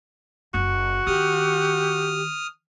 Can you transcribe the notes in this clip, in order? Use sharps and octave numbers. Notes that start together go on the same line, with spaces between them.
F#1 F#4
D#3 G4 D#6 F6